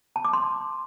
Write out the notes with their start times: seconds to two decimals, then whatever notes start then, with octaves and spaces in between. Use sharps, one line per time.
0.16 A5
0.25 D6
0.33 C6